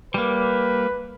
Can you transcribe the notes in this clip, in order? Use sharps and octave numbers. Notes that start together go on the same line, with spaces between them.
G3 A#3 B4